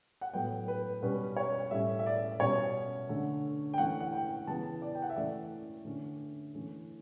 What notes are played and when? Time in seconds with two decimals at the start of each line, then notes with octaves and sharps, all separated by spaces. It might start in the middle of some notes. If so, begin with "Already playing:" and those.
0.21 F#5
0.33 A2 F#3 B3 G5
0.68 B4
1.02 B2 G3 C#4 B4
1.37 C#5
1.71 A2 G3 C#4 E5
1.99 E5
2.06 D5
2.40 B2 G3 C#4 C#5
3.09 D3 A3 C#4
3.74 G5
3.78 E3 A3 C#4 F#5
4.00 F#5
4.13 G5
4.47 C#3 E3 B3 A5
4.82 D5
4.95 G5
5.02 F#5
5.10 E5
5.16 E3 A3 C#4 D5
5.85 D3 A3 C#4
6.55 E3 A3 C#4